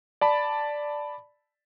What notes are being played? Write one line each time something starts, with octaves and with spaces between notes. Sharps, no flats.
D5 A5 B5